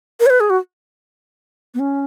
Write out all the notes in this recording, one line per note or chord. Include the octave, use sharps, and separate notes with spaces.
A#4
C#5
B4
G#4
F#4
B3
C#4